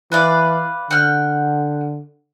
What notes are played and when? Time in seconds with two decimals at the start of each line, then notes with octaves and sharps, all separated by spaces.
0.12 E3 B4 D5 F5
0.91 D3 F#5 G5 F6